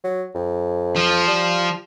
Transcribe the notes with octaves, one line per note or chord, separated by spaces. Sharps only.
F#3
F2
F3
G3